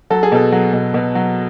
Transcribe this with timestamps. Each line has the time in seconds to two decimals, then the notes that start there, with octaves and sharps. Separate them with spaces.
0.10 F#3 A4
0.23 G#4
0.32 B2 A4
0.52 F#3
0.73 B2
0.94 B2
1.15 F#3